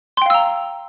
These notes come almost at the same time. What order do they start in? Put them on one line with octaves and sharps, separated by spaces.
C6 G5 F5 E6 A#5